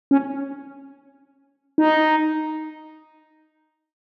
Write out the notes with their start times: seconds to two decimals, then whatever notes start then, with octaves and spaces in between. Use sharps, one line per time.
0.11 C#4
1.78 D#4